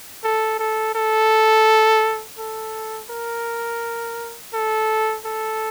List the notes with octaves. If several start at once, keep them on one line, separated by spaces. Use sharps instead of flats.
A4
A4
A4
A4
A#4
A4
A4